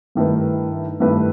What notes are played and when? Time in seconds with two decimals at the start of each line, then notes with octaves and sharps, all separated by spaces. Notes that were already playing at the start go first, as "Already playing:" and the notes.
0.15 G2 D#3 A3 E4 B4
1.00 G2 D#3 A3 E4 B4